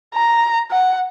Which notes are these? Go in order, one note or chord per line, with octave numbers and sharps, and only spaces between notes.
A#5
F#5